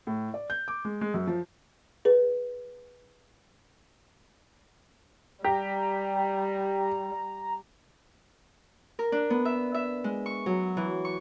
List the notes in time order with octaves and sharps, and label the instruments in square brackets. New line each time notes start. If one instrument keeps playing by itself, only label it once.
[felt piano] A2
D5
G6
D6
G#3
G#3
F#2
F3
[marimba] G#4 B4
[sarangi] G3 [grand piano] G4 [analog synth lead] A#5
[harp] A#4
D4
B3
E5
E5
G#3
C#6
F#3
E3
C#6